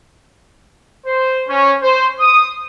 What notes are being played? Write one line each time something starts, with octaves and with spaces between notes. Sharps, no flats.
C5
C#4
C5
D#6